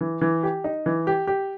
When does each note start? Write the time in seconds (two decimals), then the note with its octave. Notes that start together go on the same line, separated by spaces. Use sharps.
0.01 E3
0.21 E3
0.43 G4
0.64 D#4
0.86 E3
1.07 G4
1.27 G4